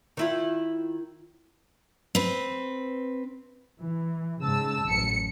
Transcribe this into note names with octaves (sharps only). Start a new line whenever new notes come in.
D#3 E4 F4
C4 B4
E3
G#2 C#3 A5 E6
A1 F#2 C#7